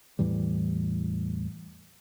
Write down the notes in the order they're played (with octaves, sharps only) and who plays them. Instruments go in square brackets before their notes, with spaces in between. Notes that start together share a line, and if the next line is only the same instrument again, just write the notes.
[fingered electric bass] E2 A2 E3 G3